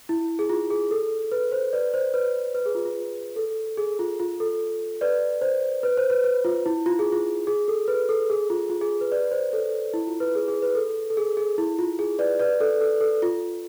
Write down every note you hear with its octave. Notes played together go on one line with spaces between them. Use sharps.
E4
G#4
F4
G#4
A4
B4
C5
B4 D5
C5
B4
B4
G#4
F4
F4
A4
G#4
F4
F4
A4
B4 D5
C5
B4
C5
B4
B4
F4
E4
F4
G#4
F4
G#4
A4
B4
A4
G#4
F4
F4
G#4
B4
B4 D5
C5
A4
E4
F4
B4
G#4
G#4
B4
A4
A4
G#4
G#4
E4
F4
G#4
B4 D5
B4 D5
A4
A4
A4
F4